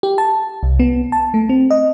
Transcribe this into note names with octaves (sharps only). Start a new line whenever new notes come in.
G4
A5
C2
B3
A5
A3
C4
D#5